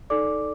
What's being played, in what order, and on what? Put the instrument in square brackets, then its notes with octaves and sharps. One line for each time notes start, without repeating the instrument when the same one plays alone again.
[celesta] D#4 A4 D5 D6